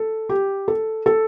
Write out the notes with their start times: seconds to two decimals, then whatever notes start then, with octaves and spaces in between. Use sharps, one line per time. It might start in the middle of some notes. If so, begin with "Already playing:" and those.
Already playing: A4
0.29 G4
0.68 A4
1.06 A4